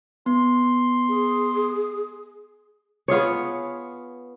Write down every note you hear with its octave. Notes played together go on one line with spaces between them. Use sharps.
B3 C6
G#4
B3 F4 G#4 C#5